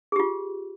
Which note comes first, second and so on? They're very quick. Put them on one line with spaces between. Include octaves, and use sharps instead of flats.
G#4 G4 F4